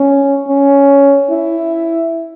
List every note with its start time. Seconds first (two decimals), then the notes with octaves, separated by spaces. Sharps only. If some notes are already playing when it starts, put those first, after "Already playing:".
Already playing: C#4
0.48 C#4
1.30 E4